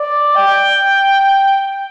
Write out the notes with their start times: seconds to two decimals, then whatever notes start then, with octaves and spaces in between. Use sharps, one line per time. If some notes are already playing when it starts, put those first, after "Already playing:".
Already playing: D5
0.36 G5